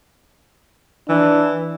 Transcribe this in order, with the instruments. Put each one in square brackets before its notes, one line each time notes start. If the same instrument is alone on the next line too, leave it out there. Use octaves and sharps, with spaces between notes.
[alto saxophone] E3 [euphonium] D4